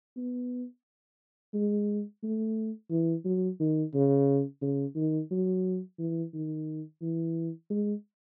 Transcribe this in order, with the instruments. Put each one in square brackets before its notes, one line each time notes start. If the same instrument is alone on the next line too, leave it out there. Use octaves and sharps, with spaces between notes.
[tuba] B3
G#3
A3
E3
F#3
D#3
C#3
C#3
D#3
F#3
E3
D#3
E3
G#3